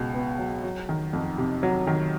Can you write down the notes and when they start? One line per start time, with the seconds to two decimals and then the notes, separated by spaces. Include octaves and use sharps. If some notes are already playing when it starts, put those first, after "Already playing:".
Already playing: C#2 B2
0.14 B3
0.38 F#3
0.64 F#3
0.89 D#3
1.13 F2
1.38 C3
1.63 F#3
1.87 D#3